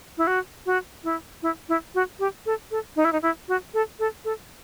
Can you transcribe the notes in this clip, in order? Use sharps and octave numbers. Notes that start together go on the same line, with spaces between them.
E4
F#4
F#4
E4
E4
E4
F#4
G4
A4
A4
D#4
E4
D#4
E4
F#4
A4
A4
A4